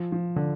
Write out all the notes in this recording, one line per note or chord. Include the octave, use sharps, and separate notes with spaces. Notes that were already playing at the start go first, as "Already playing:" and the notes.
Already playing: F3
F3
D3